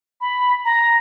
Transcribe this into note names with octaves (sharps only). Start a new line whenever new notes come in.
B5
A#5